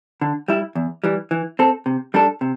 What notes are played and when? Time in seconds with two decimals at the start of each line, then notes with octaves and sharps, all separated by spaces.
0.21 D3
0.48 G3 E4
0.75 E2
1.04 E3 G3
1.31 E3
1.59 C4 A4
1.86 C3
2.14 G3 D4 A4
2.41 C3